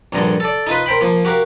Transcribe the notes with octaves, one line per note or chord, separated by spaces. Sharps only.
A#1 G2 D3 A#5
A4 D5
D#4 F4 B4
A#4 C5 G5 B5
F3 A#3
F#4 G4 A#4 F5